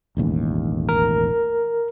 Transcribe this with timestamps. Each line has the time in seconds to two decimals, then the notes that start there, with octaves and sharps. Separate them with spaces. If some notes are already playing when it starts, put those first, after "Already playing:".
0.17 E1 A1 D#2
0.89 A#4